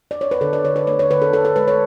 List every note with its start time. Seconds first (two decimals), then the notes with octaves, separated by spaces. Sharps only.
0.11 D5
0.21 C#5
0.31 B4
0.41 D3 A4
0.53 D5
0.64 D3 C#5
0.76 B4
0.87 A3 C#5
0.99 C#5
1.10 D3 B4
1.22 A4
1.32 D3 A4
1.45 A4
1.56 G#3 B4
1.68 C#5